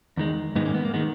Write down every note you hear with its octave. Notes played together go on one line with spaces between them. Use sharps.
E2 D#3 G#3
G#2 D#3 G#3 B3 D#4
A#3 C#4
B3
A#3
D#3 G#3 B3